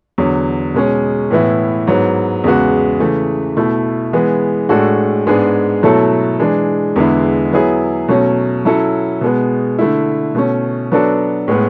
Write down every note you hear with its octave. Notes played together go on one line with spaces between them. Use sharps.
E2 D3 F#3
B2 G#3 C#4
A2 E3 B3 E4
G#2 F#3 B3
E2 C#3 G#3 B3 F#4
C#3 E3 A3
B2 A3 E4
E3 G#3 B3
A2 G#3 D4 F#4 A4
G#2 G#3 B3 D4 G#4
B2 F#3 A3 E4 A4
E3 G#3 D4
E2 D3 G#3 B3 E4
F#3 B3 E4 G#4
B2 F#3 A3 C#4
F#3 C#4 E4 A4
B2 G#3 B3
D3 A3 E4
B2 A3 C#4
F#3 B3 D4 F#4 A4
A2 G#3 B3